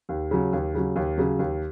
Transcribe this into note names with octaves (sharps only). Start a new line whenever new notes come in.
D#2
C#3 F#3
D#2
C#3 F#3
D#2
C#3 F#3
D#2